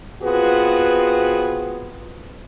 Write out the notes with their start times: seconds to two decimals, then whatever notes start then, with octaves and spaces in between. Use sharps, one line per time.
0.23 B3 C4 F4 F#4 G#4 B4